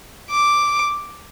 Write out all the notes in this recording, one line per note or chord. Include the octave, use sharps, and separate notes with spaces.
D6